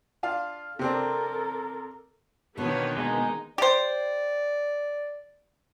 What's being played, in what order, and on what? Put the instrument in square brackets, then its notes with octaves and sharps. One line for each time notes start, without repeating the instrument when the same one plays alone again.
[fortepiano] D4 F4 F5
[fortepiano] C3 C4 D4 [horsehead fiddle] A4 A#4
[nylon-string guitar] B2 D3 [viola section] D#3 A#3 B3 [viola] C#5
[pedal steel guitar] G#3 [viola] D#4
[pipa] G4 C5 [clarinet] D5